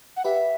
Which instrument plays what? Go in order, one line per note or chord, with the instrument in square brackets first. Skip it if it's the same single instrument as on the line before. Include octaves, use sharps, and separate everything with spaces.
[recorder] F#5
[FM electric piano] G4 B4 [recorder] E5